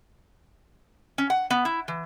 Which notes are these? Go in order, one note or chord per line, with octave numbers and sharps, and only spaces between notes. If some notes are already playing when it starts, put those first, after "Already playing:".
C#4
F#5
B3
E4
E3